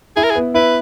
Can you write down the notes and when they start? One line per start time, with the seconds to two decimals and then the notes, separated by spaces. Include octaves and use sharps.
0.16 E4 G#4
0.24 A#4
0.31 G#4
0.35 B3
0.54 E4 B4